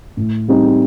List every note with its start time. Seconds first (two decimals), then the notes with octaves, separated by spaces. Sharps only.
0.17 A2
0.48 G3 C4 D#4